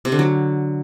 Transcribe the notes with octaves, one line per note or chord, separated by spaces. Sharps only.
C3
D3
F#3